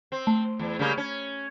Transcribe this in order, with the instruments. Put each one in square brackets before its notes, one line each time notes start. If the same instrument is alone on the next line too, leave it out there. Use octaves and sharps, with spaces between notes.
[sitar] C4
[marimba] A3
[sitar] E2
C#3 G3 A#3
C#4